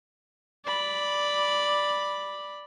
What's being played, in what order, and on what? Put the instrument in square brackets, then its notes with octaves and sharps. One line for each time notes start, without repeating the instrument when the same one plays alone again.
[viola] D5 B5